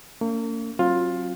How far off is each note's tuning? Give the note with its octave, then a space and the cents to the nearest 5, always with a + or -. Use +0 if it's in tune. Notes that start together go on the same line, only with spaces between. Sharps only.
A#3 -40 C#4 +45
F#3 +0 C4 +40 F4 +15